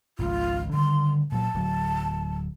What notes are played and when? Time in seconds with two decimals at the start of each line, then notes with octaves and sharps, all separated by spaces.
0.19 G#1 C#2 D#3 F4
0.73 D3 D#3 G3 C6
1.32 A#2 F#3 A5
1.54 D1 F#3